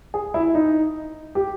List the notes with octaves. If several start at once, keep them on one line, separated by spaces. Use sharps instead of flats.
G#4
E4
D#4
G4